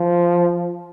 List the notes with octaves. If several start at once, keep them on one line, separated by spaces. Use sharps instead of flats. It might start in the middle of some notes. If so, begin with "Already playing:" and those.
Already playing: F3